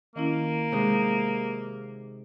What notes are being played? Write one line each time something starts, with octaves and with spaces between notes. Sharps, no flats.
D#3 A#3 C#4 E4
C3 G#3 D#4